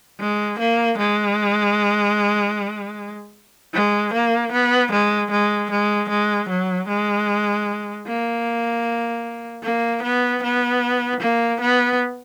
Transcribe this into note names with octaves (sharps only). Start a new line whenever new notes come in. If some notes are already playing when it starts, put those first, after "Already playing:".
G#3
A#3
G#3
G#3
A#3
B3
G#3
G#3
G#3
G#3
F#3
G#3
A#3
A#3
B3
B3
A#3
B3